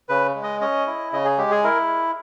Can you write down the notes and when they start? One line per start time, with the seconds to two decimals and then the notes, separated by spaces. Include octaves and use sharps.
0.09 C#3 B4
0.35 G#3
0.43 D#5
0.61 C#4 D#5
0.87 E4
1.13 C#3 D#5
1.25 G#4
1.38 G#3 G4
1.51 G#4
1.64 E4 A#4